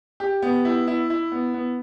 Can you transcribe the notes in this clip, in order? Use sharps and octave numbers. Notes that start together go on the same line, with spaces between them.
G4
B3
E4
E4
E4
B3
B3